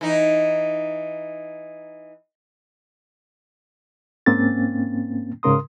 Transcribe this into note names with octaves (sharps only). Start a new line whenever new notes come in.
E3 D#4
G#2 A#3 C4 C#4 A6
G#2 C#3 A#4 C6 D#6